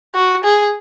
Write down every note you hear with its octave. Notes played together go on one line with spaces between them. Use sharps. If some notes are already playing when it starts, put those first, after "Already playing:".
F#4
G#4